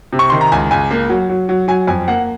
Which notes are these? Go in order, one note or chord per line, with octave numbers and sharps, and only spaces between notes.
C3
C#6
D#3 C6
A#5
C#2 G#5
C#2 G#5
A#3
F#3
F#3
F#3
F#3 G#5
F2 G#5
A#3 F#5